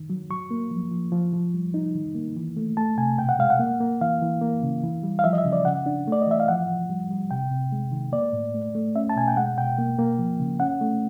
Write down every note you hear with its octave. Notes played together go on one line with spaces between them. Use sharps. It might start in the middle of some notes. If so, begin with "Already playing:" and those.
Already playing: D#3
F#3
F#3 C#6
A#3
F3
F3
F3
F3
G3
D#4
D#3
A#3
E3
A3
A3 A5
C3 G#5
B2 G5
F#5
G#3 F5
F#5
A#3
A#3
E3 F5
E3
A#3
C#3
E3
G3
F5
F3 E5
D#5
E5
C#3
D5
C#3 F#5
D4
A3 D5
D#5
E3 E5
F5
F3 F#5
F3
G3
G3
C3 G5
C3
G#3
D#3
A#3 D5
A2
A3
A3
C#4 E5
A5
B2 G#5
G5
G#3 F#5
B2 G5
A#3
A#3
F3
C#3
C#4 F#5
A3